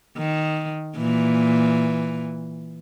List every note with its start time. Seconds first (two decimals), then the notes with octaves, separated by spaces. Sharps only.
0.17 D#3
0.96 A#2 E3